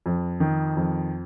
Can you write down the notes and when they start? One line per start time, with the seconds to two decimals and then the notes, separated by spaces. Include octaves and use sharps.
0.06 F2
0.40 D#3
0.77 F2